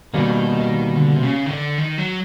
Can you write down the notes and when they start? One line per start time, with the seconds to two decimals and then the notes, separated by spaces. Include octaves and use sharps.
0.14 B2 D#3 G3 A#3
0.96 D3
1.16 C3
1.23 C#3
1.46 D#3
1.50 D3
1.78 D#3
1.98 F#3